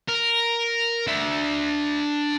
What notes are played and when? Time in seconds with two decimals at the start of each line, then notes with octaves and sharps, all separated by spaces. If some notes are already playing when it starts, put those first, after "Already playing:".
0.09 A#4
1.07 D4 E5